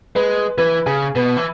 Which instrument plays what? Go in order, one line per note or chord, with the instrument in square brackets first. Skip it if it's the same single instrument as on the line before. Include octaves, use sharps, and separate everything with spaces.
[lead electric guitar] G#3 [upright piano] B4
[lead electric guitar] E3 [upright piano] B4
[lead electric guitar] C#3 [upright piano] G#4
[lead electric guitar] B2 [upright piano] B4
[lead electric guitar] E3